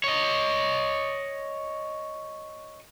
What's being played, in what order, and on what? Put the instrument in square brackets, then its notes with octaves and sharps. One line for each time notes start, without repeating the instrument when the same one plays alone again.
[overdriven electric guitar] C#5 D#5